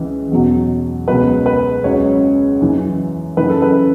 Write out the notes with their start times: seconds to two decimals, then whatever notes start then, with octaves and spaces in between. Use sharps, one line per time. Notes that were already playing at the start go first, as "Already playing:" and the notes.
Already playing: C#2 C#3 E3
0.31 E2 B2 F#3
1.08 C#2 B2 F#3 B4
1.46 B4
1.84 C#2 C#3 F#3 C#5
2.61 F#2 C#3 E3
3.37 F#2 C#3 E3 B4
3.50 A4
3.62 B4